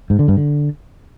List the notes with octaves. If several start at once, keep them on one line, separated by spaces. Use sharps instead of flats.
G#2
D3
G2
D3